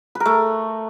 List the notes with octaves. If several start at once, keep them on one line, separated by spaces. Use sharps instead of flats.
B4
A#4
A3